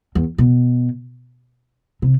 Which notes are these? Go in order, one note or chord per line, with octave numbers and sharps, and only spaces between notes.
E2
B2
C3